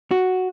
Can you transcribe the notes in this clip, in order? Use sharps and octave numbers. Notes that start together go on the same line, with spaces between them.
F#4